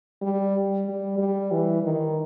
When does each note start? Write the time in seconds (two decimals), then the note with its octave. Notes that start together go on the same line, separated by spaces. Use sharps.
0.22 G3
0.86 G3
1.18 G3
1.52 E3
1.83 D#3